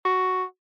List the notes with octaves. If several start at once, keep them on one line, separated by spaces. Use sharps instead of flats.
F#4